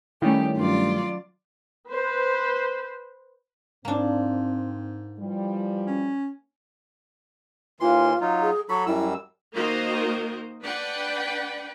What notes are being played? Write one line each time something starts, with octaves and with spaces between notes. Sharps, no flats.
D#3 G3 A3 C#4 E4 G4
G2 F#3 F4 D5
B4 C5
G#2 A#3 C4 D4
E3 F3 G3
C#4
D#2 E3 F4 C6
F#3 D#4 F4
G#4
F#3 A4 B5 C#6
F#2 G3 E4 E6
D#3 A#3 F#4 A#4 C5 D#5
D4 B4 D5 F#5 G5 B5